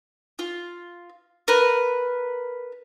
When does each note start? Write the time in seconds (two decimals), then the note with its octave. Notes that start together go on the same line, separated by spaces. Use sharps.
0.39 F4
1.48 A#4 B4